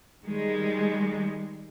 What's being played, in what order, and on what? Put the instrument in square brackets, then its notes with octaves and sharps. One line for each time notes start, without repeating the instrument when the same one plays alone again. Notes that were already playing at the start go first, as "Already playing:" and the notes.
[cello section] D#3 G3 G#3